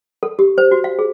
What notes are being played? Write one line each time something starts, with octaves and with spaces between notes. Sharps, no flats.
A4
G4
C5
F#4
F5
G#4